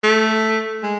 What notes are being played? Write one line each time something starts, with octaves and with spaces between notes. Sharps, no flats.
A3
G#3